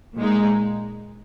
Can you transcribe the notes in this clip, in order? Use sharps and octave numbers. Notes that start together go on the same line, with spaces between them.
A#2 G#3 D#4